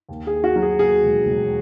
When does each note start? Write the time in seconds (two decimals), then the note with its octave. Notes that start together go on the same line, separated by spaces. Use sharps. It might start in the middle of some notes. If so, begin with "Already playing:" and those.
0.09 D#2
0.27 D#2 G#4
0.44 F#4
0.56 F#3
0.62 G#4
0.79 D#2 G#4
1.03 E1
1.26 E1